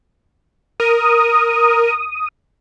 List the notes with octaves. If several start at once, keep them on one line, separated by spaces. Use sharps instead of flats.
A#4 D#6